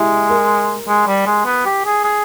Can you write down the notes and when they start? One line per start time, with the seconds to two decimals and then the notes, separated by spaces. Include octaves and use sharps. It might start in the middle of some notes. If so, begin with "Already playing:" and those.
Already playing: G#3 E4 G4 E5
0.30 A#4
0.88 G#3
1.07 G3
1.26 G#3
1.45 B3
1.66 G4
1.85 G#4
2.04 G#4